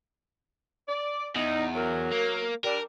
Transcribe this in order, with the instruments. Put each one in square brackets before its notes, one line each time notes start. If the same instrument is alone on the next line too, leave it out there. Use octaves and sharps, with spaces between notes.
[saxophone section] D5
[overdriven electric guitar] E2 [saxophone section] D#4
[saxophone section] F#3 A#4
[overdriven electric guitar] A#3
[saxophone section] G3 D4 [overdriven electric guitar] A#4